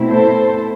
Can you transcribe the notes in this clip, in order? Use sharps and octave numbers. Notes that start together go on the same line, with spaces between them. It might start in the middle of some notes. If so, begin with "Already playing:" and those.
Already playing: B2 A3 C4 E4
A4 C5